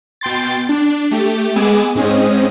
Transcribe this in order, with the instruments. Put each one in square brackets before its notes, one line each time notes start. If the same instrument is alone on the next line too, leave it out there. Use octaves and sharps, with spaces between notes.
[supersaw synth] B2 G5 C6 A6
D4
A3 G4
G#3 B3 G#4 G#5 D6 E6
G#2 G#3 C4 C#4 D#6